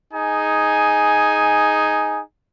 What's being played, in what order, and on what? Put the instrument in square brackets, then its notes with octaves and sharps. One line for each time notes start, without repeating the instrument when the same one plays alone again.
[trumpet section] D#4 G#4 G#5